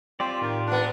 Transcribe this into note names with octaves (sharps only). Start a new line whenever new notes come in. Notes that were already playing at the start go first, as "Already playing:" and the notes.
C4 F4 G4 D5 C6
A2 D#3
A#2 B3 D4